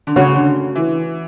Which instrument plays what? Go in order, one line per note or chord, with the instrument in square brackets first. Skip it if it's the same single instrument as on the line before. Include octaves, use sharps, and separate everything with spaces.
[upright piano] D3
[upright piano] C#3 [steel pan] A3 C#4 F#4 C#5 F#5
[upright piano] D3
E3